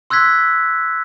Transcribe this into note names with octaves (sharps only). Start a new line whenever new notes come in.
C6 E6 F#6 G#6 B6